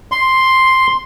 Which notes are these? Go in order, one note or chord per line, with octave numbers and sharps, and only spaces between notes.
C6